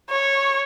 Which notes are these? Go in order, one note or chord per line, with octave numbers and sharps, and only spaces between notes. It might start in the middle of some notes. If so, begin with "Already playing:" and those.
C#5